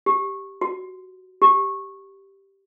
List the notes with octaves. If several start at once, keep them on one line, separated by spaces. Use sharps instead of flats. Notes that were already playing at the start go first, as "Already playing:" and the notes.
G4
F#4
G4